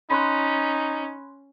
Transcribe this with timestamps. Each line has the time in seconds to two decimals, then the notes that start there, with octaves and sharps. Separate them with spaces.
0.10 C#4 D#4 B5 C6 F#6